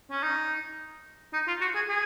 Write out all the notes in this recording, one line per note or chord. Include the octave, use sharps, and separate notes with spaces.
C#4
D#4
D#4
F4
F#4
G#4
G#4